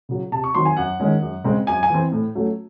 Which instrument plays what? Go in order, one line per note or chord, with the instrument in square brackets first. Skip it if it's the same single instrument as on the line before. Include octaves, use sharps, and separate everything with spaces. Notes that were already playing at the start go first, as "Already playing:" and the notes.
[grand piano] C#3 F#3
C3 A5
C#6
D#3 F#3 C4 C6
G#5
F#2 F#5
D#3 G#3 C#4
F#2
C#3 G#3 C4
F#2 G#5
G#5
E3 C4
A2
F#3 A3 C#4